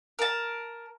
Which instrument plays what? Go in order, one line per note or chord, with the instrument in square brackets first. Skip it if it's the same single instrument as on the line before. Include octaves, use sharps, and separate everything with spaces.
[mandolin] A#4 A5